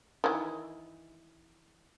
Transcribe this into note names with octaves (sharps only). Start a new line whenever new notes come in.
D#3 E3